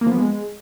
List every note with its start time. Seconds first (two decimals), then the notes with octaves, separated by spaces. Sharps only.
0.01 A#3
0.06 F3
0.12 B3
0.17 G#3